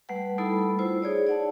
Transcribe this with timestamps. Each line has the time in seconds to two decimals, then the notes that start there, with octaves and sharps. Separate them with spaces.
0.09 G3 A3 B4 F#5
0.38 G3 A3 D#4 E4 A4 B5
0.79 E4 F4 C5
1.02 D#4 G#4 C#5 D5
1.27 D5 F#5 A5